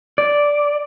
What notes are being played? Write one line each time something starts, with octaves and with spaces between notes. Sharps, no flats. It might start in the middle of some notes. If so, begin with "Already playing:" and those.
D5